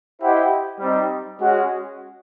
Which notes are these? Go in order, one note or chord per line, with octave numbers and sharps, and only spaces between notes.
E4 G4 C5 D#5 F#5
G3 C4 D#4
G#3 C#4 F#4